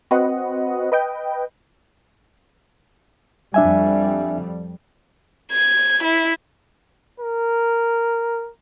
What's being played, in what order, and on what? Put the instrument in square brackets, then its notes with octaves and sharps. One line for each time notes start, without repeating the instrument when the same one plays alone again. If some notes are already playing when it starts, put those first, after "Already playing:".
[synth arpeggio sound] C4 F#4 B4 D#5 F#5
B4 D#5 G5
[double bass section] F2 G3 [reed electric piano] D4 E5 G#5
[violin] G#6
E4
[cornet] A#4